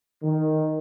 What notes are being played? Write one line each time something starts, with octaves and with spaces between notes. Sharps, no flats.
D#3